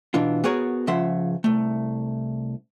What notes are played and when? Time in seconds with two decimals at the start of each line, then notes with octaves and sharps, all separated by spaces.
0.14 B2 E3 D4 F4
0.44 B3 F#4 G#4 A#4 C#5
0.87 C#2 C#3 F3 E5 F#5 C6
1.44 C2 A3